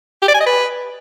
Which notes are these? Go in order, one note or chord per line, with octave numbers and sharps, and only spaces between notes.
G4
D5
G#5
D#5
B4